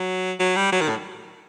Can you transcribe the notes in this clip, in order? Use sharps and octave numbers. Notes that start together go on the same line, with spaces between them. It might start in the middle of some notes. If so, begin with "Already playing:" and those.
Already playing: F#3
F#3
G3
F#3
D#3
A2